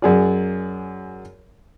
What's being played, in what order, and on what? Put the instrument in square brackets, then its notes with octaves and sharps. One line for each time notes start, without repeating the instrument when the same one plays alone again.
[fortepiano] F#2 G#4 D5